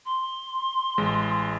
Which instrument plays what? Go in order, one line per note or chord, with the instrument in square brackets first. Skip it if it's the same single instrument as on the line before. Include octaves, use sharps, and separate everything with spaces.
[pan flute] C6
[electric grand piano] A1 G#3